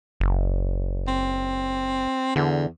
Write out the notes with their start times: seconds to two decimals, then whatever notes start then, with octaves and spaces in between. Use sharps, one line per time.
0.20 F#1
1.08 C4
2.36 E2 D3